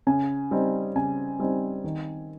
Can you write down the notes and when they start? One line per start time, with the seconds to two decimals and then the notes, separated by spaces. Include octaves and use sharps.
0.07 C#3 G#5
0.51 G3 C4 D#4
0.96 C#3 G#5
1.39 G3 C4 D#4
1.84 D#3